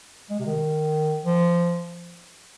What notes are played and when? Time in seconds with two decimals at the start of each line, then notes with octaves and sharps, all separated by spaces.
0.30 G#3
0.40 C3
0.46 D#3
1.25 F3